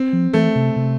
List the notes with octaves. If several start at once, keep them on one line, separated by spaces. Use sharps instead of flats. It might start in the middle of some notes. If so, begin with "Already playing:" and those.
Already playing: C4
F3
E3 A3
C3
C3